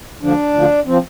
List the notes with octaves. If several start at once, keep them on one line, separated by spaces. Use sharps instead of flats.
D2 D3 F3 D4
D2 D3 F3
F3 C4